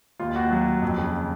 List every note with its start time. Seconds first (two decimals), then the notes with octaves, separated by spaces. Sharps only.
0.20 D#2 F4
0.35 D#2 F#4
0.51 F#3
0.67 D#2
0.82 F2
0.98 C#3